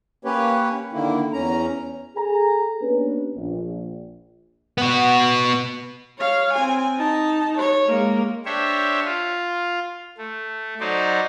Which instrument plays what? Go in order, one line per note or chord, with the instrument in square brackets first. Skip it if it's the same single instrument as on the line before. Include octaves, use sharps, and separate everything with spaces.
[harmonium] A#3 C#4 G4 B4 C#5
D3 D#3 A#3 E4
E2 C#4 A#5
[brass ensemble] G#4 A4 G#5 A#5
A#3 B3 C#4 D4 G4 B4
A#1
[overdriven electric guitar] B3 F#4
[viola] C#5 F5
C4 G#5
D#4 A5
C#5
G#3 A#3
[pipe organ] D4 G4 C5 C#5 E5
F4
A3
F#3 D#4 C5 D5